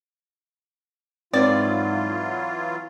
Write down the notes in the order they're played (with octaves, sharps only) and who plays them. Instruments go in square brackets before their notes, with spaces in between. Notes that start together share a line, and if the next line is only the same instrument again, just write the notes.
[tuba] G#2 [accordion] E3 F#3 F4 [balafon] C4 B4 C#5 [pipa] D5